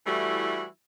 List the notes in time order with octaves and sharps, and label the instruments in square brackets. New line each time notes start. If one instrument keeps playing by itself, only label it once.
[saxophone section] E3 G3 A3 E4 F#4